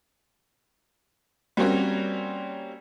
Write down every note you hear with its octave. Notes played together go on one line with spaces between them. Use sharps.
G3 A#3 C4 C#4 F#4